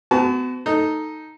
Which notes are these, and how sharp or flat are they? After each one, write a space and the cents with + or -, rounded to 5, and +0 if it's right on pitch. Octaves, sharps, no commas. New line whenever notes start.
B3 +40 F#4 +15 A5 -30
D#4 +0 A4 +10